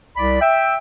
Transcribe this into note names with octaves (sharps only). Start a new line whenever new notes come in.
C2 D5 B5
E5 G5